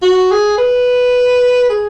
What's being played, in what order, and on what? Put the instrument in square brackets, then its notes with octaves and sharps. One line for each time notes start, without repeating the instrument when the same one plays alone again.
[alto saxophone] F#4
G#4
B4
G#4